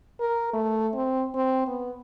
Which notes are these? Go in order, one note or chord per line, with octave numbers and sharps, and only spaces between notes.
A#4
A3
C4
C4
B3